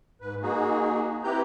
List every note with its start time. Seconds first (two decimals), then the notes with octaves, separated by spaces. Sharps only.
0.21 G#2 B4
0.42 A#3 D#4 F#4 G#4
1.24 C4 E4 G4 B4 A#5 G6